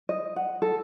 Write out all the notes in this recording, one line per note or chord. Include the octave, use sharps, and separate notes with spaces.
D#5
F#5
A4